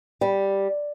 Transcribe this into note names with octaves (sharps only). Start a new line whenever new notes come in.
G3